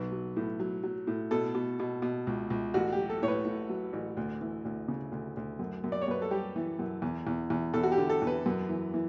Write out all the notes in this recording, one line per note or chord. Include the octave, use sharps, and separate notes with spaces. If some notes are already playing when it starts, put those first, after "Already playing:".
Already playing: B1 B4
F#3
A2
F#3
F#3
A2
B2 A4
B2
B2
B2
C#2
C#2
A1 F#4
G4
F#3
A4
A2 C#5
B4
A2
F#3
A1
D2
E3
D2
C#3
D2
D2
F#2
F#2
D5
C#5
F#2 B4
A4
G3 G4
E3
F#2
E2
E2
E2
E2 A4
F#4
G4
D3
A4
E2
B4
F#2
E3
E3